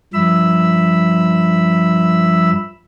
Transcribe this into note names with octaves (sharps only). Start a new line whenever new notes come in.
G2 F3 E5 B5 E6